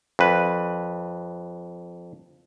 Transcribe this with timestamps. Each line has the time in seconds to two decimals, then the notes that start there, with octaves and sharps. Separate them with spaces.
0.19 F2 B4